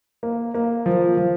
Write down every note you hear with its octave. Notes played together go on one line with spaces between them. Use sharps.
A#3
A#3
F3
F3